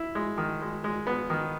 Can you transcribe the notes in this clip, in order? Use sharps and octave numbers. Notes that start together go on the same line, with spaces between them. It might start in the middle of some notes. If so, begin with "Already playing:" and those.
Already playing: E4
G#3
D#3
G#3
G#3
B3
D#3